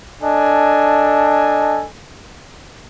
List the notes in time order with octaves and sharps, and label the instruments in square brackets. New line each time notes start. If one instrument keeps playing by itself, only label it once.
[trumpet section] D4 A4 D#5 G#5